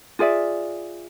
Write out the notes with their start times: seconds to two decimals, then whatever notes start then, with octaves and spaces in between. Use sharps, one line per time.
0.19 F4 G#4 D5 E5